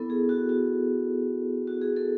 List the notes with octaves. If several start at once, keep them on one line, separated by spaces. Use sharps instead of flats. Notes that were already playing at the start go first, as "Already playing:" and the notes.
Already playing: B3 E4 A4
G#4
F#4
F#4
F#4
G#4
A4